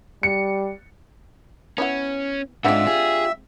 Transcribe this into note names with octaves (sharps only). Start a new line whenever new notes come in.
G3 C#7
B3 C#4 E4 F#5
G#2 G#3 C4 D4 D#4 F4 E5 F#5
F4 G4 G#4